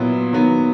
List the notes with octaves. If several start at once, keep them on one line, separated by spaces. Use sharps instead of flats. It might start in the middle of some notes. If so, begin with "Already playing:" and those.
Already playing: A#2 F#3 B3 E4
D#3 F#3 B3